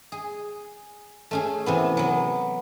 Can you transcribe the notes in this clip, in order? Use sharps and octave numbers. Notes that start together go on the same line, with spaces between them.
G#4
A3 C#4 G#4
C3 E3 B3
F#3 B3